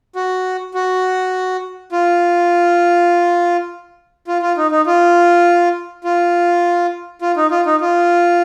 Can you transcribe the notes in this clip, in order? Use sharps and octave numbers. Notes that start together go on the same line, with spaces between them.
F#4
F#4
F4
F4
F4
D#4
D#4
F4
F4
F4
D#4
F4
D#4
F4